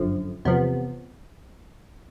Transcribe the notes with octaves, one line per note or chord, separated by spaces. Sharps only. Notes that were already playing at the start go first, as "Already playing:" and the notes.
Already playing: G1 F#2 D3 F3
E2 C3 F3 B3